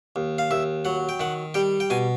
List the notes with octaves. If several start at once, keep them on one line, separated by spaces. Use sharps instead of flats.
D#2
F5
D#2 E5
F#3 F#5
G5
D#3 F#5
G3 G5
G5
B2 G#5